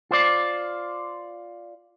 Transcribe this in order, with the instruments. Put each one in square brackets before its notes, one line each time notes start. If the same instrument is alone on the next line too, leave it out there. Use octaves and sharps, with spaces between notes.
[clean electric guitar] F4 C5 D5